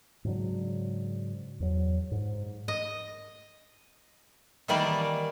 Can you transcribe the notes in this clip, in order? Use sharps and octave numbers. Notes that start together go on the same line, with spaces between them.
G#2 C#3 F#3 D4
E2 F#3
G#2
D#5
D#3 E3 G3 A#3 D5